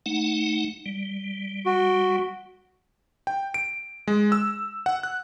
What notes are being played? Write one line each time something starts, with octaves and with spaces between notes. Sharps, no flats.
A3 D#4 F#5
G3
F#4
G5
D7
G#3
E6
F#5
F#6